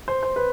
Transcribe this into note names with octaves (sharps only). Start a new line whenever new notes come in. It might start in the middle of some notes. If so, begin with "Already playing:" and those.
C5
C5
B4